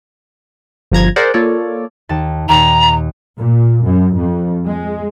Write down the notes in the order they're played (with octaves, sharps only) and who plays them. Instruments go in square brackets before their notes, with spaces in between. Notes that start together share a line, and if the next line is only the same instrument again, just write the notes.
[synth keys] G1 F3 A#5 G#6
G#4 A#4 C5 D5 F#5
A#3 F4 A4 C#5 D5
[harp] D#2 A5 E7
[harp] D#2 A#2 [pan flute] A#5
[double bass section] A#2
F#2
F2
G#3